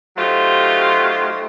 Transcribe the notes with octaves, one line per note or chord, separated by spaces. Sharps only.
F#3 A3 D#4 F4 G4 C5